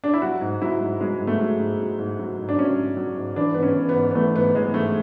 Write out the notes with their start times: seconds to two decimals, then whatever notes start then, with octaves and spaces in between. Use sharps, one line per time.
0.04 D4
0.13 E4
0.22 F#3 F#4
0.41 G#2
0.62 F#3 E4
0.81 G#2
1.01 F#3 G#3
1.21 G#2
1.27 A3
1.41 F#3
1.59 G#2
1.79 F#3
1.99 G#2
2.19 F#3
2.39 G#2
2.49 D4
2.58 F#3 C#4
2.77 G#2
2.97 F#3
3.16 G#2
3.36 E3 D4
3.54 G#2 B3
3.62 C#4
3.75 E3
3.89 B3
3.95 G#2
4.11 B3
4.15 E3 A3
4.35 G#2 B3
4.55 E3 G#3
4.74 G#2 A3